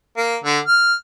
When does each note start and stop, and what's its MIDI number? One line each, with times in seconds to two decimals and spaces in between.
0.17 0.37 58
0.44 0.59 50
0.67 0.94 89